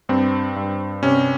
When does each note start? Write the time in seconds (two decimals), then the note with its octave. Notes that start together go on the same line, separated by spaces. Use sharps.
0.09 G2 C4
0.56 G2
1.03 C3 C#4